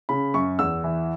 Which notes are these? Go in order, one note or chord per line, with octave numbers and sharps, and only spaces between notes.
C#3 B5
F#2 C#6
E2 E6
E3